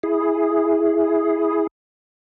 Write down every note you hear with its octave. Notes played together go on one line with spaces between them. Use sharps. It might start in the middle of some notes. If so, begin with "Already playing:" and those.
E4 G#4